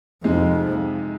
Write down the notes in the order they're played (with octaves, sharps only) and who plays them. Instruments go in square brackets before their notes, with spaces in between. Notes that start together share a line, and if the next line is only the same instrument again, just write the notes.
[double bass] F2 [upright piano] C3 G#3 D#4